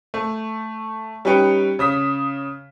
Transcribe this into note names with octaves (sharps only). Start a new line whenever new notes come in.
A3
G3 C#4 D#4 B4 G5 C#7
C#3 D#6 B6